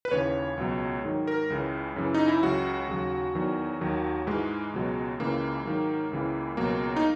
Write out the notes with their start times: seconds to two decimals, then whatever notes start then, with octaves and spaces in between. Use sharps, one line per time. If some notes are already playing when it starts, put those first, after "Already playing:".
0.05 B4
0.11 D#2 C#3 E3 C#5
0.57 C#2 B2 F#3
1.04 G#2 D#3 F#3
1.27 A#4
1.50 C#2 C#3 E3
1.96 F#2 C#3 E3
2.14 D#4
2.28 E4
2.43 C#2 C#3 F#3 F#4
2.88 D#2 C#3 F#3
3.35 E2 D#3 F#3
3.81 D#2 D#3 F#3
4.27 G#2 E3 G#3
4.73 C#2 B2 F#3
5.20 C#2 C#3 E3 A#3
5.66 G#2 D#3 F#3
6.11 C#2 C#3 E3
6.57 C#2 B2 F#3 A#3
6.96 D#4